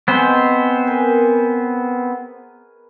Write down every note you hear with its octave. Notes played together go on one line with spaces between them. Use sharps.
B3 C4 G#4 C5 D#5 C#6
A#4 B4 G#5